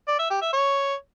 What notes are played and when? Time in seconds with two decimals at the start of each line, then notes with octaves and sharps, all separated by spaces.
0.08 D5
0.19 E5
0.30 G4
0.42 E5
0.53 C#5